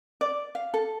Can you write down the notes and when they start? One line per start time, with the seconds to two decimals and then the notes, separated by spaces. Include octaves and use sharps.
0.21 D5
0.55 F5
0.74 A4